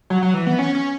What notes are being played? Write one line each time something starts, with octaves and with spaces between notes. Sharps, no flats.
F#3
F#3
E3
B3
C#4
C#4